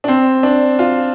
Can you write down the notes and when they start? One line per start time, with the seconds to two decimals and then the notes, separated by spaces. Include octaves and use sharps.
0.04 D4
0.08 C4
0.43 D4
0.79 F4